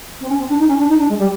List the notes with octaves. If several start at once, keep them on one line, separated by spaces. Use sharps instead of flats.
C4
C#4
C4
D4
D#4
C#4
D4
D#4
D4
G#3
G3